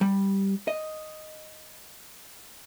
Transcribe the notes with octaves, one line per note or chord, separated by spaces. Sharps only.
G3
D#5